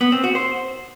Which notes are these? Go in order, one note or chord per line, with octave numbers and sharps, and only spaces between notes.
B3
C4
F#4
C5